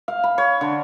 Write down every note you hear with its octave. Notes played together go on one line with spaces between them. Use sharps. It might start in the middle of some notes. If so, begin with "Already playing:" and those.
F5
B5
C#5
D3